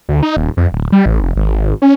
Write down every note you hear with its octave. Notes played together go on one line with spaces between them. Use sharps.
D2
D#4
D#1
F2
D1
G3
A1
F1
G#1
C#4